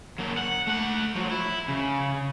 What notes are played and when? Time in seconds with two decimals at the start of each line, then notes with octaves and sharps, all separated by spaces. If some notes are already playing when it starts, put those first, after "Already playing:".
0.19 F#3 A#3
0.38 F#5
0.68 A3 F#5
1.16 F3 F#3
1.32 E4
1.69 C#3